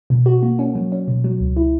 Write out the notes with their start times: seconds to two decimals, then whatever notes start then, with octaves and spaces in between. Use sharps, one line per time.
0.10 B2
0.26 F#4
0.43 A#3
0.59 C#4
0.75 F#3
0.92 C#4
1.08 B2
1.24 F#3
1.40 C#2
1.56 E4